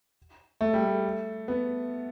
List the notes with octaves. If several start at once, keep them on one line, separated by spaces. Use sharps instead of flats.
A3
G3
A3
B3